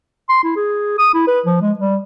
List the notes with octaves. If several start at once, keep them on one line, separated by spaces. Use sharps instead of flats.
C6
E4
G#4
D#6
E4
B4
F3
G#3
G3